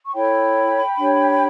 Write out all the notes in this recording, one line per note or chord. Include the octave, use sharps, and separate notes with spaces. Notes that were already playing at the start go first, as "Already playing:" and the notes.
C#6
E4 A4 C#5 G5 B5
D4 G4 C#5